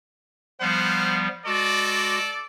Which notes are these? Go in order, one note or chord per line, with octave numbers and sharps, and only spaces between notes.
F3 G3 B3 C5 F5 F#5
G#3 F#4 A4 D5